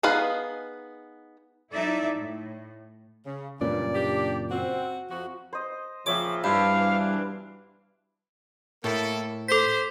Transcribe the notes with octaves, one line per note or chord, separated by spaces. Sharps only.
B3 D#4 G#4 B4 F5
F#3 D#4 E4 A4 D5 E5
A2
C#3
F#1 G2 A#2 C#4 D5
D4 G4
C4 F#4
F2 F3 F#4
C5 D#5
A#2 C#3 F3 C#5 E5 G5 D6
G2 D4 E4 G4 C5 F5
B2 E3 D4
A2 A#3 E4 A4
A4 C5 B6